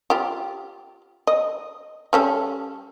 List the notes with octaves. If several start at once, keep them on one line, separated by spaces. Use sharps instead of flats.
F4 G4
D#5
G3 C#4 A4